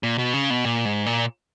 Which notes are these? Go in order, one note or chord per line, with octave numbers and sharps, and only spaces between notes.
A#2
B2
C#3
B2
A#2
G#2
A#2